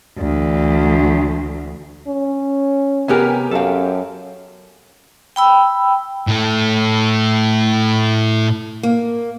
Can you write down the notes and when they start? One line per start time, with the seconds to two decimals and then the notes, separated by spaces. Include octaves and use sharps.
0.19 D2 E3
2.07 C#4
3.08 C3 B3 G4 A#4 G#5
3.51 F#2 A4 F5
5.36 G5 B5 E6
6.27 A2 A4
8.83 A#3